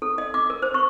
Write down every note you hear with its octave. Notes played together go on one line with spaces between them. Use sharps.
A4
D#5
D6
A#4
C5
C#6